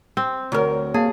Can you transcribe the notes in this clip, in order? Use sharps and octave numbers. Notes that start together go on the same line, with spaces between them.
C4
D2 F#3 A#4
A#3 G#4 F5 A5